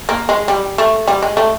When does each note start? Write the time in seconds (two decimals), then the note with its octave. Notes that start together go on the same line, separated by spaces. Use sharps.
0.09 A#3
0.29 G#3
0.48 G3
0.78 A3
1.08 G3
1.22 G#3
1.37 A3